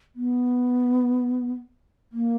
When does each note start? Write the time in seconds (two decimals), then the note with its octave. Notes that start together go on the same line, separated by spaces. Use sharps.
0.16 B3
2.12 A#3